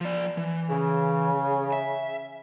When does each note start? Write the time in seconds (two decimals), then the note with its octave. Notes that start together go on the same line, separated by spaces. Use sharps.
0.01 F3 D5
0.37 E3
0.69 C#3
1.72 E5